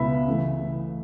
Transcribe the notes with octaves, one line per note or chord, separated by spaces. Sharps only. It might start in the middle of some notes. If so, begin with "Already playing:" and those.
Already playing: C#2 B2 B3 E4 E5 B5
C#3 E3 A3